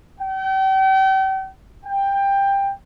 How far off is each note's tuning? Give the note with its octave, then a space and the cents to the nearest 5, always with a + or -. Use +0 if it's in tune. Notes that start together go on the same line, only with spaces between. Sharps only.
G5 -40
G5 +15